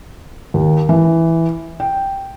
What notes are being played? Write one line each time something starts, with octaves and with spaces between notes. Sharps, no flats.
D#2
E3
G5